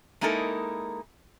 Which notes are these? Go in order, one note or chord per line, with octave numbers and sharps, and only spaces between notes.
G#3 A#3 D#4 E4 A4 A#4